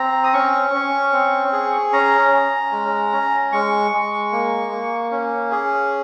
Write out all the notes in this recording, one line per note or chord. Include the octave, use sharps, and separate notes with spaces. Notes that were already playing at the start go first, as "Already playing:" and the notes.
Already playing: C4 A#5
D#6
C#4 C#6
C#4
C4
G#4
C#4 A#5
C#4
G#3
C#4
G#3 C#6
G#3
A#3
A#3
C#4
G#4